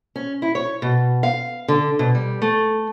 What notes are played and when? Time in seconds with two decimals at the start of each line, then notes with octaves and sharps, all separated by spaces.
0.16 C#4
0.42 E4
0.55 C#5
0.82 B2
1.23 F5
1.68 D3
1.99 B2
2.15 G3
2.42 A3